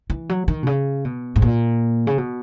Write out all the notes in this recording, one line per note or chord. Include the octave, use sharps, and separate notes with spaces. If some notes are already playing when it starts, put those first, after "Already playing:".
E3
F#3
D#3
B2
C#3
B2
G#2
A#2
C#3
B2